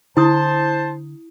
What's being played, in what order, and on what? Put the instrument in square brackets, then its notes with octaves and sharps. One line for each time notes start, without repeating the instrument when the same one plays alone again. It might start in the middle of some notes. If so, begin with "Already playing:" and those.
[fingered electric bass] D3 [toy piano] E4 D#6 [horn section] C5 A5